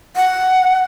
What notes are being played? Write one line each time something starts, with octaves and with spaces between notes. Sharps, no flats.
F#5